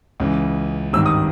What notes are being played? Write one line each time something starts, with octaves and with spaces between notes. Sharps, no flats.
C#2 C#3 E3
G#1 G2 D#3 E6
D#6